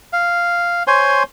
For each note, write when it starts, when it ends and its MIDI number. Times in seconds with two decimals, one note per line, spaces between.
0.13 0.83 77
0.87 1.23 72
0.87 1.23 73
0.87 1.23 80
0.87 1.23 84